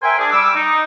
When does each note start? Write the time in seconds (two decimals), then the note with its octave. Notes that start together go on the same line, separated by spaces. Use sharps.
0.02 A#4 C5 E5 G5 G#5
0.18 D4 G#4
0.32 G3 D6 E6
0.55 D#4